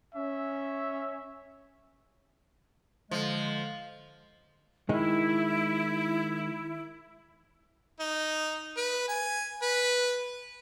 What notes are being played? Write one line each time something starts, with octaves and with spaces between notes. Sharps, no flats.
C#4 E5
D3 F3 G#3
D#3 G#3 E4
D#4
B4
G#5
B4